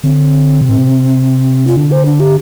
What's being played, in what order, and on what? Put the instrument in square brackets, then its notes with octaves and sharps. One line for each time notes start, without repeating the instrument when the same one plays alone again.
[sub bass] D3 [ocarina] C4
[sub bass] C3
A2
C3
[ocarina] F4
[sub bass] D3 [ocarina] D4
[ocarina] C5
D4
G4